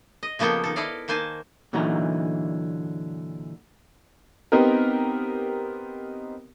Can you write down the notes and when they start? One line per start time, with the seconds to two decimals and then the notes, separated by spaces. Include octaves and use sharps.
0.23 D#5
0.39 C#3 F3 A#3 B3 A4 G5
0.64 D#3 A4
0.76 E4 A4 D5 D#5 F5
1.08 D#3 A#3 C5 G#5 A5
1.73 A#2 D3 E3 F#3 D#4 A#5
4.52 B3 C4 D#4 G4 A#4